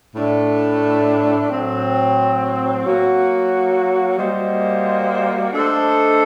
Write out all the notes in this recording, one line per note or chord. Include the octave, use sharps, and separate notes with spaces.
A2 A3 D4
A2 F#3 C4
F#3 A#3 F#4
G3 A#3 F#4 C5 D#5
A3 D4 A4 C5 D#5